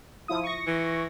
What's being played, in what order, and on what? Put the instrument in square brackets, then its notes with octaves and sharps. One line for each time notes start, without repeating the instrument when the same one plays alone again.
[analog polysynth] F3 E4 D#6
C#6 A#6
[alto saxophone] E3